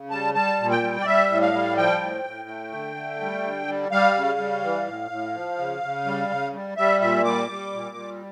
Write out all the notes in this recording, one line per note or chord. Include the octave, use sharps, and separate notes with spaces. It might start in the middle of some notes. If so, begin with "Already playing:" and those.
Already playing: C#3
G3 A5
G3 A5
A#2
G5
G3
D5
G3 E5
A2
F5
G3
F3 G5
A2
A2
A3
D3
A3
G3
D3
G3
G3 F5
C#3
G3
E3
A2
A2
F3
C#3
C#3
G3
C#3
G3
G3 E5
A#2 E5
G3 D6
G3
A#2
G3